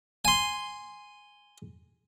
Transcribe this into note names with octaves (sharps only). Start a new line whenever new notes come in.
G#5 C6